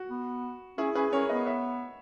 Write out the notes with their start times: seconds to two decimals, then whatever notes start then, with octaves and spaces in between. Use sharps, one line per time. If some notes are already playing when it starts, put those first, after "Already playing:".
Already playing: F#4
0.10 B3
0.78 C#4 E4 G#4
0.95 C#4 G#4 B4
1.12 C#4 A#4 C#5
1.29 B3 B4 D#5
1.46 C#5 E5